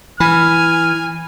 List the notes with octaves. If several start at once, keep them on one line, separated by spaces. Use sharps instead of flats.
E3 G#5 B5 F6